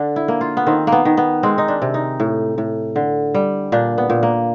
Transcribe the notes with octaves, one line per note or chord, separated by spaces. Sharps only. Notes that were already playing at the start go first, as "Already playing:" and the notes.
Already playing: D3 D4
E4
A#3
F4
B3
D#3 C4
A#3
B3
D#3
B3
G#3 C4
D#4
D4
C3
D#4
A2
A2
D3
G3
A#2 D4
B3
A#2
A#3